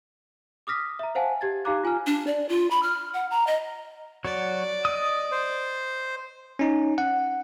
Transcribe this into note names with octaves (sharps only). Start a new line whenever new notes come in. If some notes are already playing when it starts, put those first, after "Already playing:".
D6 D#6 F6 A#6 B6
E5 A#5
C5 F5 F#5 G#5 A5
G4 G#6 A6
D#4 G4 F5 A#5 D6 F#6
F4 G#5 A#5 F6
D4
D5
F4
B5
F6
F#5
A#5
D#5
F#3 F#4 C#5 D5
D#5 D#6
C5
C#4 D#4
F#5